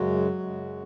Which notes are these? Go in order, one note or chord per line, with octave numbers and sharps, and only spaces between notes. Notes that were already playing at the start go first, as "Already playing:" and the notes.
Already playing: F#2 C#3 F#3 G#3 F#4
F#2 C#3 G#3